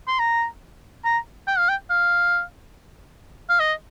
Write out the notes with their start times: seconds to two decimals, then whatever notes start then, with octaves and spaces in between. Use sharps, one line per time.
0.08 C6
0.19 A#5
1.05 A#5
1.47 G5
1.58 F5
1.69 G5
1.90 F5
3.49 F5
3.60 D#5